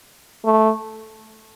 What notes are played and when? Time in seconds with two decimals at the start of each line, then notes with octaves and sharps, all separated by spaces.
0.45 A3